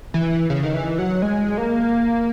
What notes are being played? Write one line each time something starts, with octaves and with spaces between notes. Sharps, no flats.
E3
C#3
D#3
E3
F#3
G#3
A#3